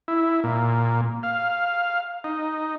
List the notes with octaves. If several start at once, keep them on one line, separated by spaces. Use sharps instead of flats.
E4
A#2
F5
D#4